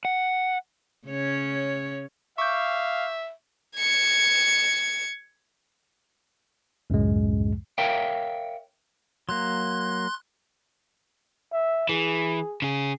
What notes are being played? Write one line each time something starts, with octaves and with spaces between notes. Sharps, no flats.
F#5
C#3 C#4 C#5
E5 F5 C#6 D6 G6
G#6 C#7
C#2 F#2 A2 G#3
A#4 C#5 E5 F5 G5
F#3 A#3 C6 F#6
E5
E3 G#4
C#3 G#4